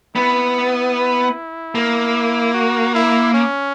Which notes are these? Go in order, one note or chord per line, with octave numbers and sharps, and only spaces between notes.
B3 E4
A#3
F#4
E4
C#4